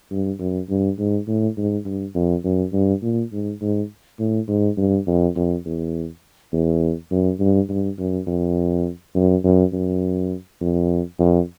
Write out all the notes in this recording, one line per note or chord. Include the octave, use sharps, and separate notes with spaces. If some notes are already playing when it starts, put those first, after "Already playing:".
G2
F#2
G2
G#2
A2
G#2
G2
F2
F#2
G2
A#2
G#2
G#2
A2
G#2
G2
F2
F2
E2
E2
F#2
G2
G2
F#2
F2
F#2
F#2
F#2
F2
F2